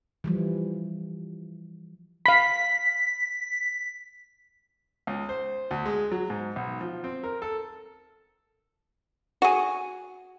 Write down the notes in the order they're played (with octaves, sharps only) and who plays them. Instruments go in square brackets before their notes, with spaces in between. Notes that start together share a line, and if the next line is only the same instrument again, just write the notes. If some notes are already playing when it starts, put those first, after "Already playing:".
[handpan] E3 F3 G3
[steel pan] F5 B5 [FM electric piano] B6
[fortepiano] C#2
C5
D2
G#3
F#3
G#2
B1
F3
C4
A#4
A4
[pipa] F#4 G#4